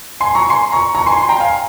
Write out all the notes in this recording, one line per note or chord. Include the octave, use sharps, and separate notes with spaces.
G#5 C6
A#5 C#6
G#5 C6
A#5 C#6
A#5 C#6
G#5 C6
G#5 C6
G5 A#5
F5 G#5